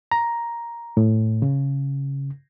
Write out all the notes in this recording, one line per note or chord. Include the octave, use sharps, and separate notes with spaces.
A#5
A2
C#3